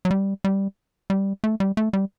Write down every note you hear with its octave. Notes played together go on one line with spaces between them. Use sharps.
F#3
G3
G3
G3
A3
G3
A3
G3